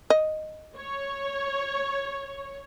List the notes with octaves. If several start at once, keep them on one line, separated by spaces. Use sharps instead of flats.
D#5
C#5